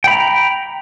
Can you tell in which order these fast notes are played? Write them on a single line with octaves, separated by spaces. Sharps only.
G5 B5 A#5